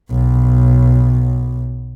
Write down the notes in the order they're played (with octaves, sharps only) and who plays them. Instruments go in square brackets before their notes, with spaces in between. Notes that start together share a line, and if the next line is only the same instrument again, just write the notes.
[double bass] B1 B2